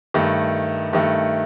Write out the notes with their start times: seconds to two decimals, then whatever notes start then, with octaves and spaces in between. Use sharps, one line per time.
0.14 G2 D#3 A3
0.93 G2 D#3 A3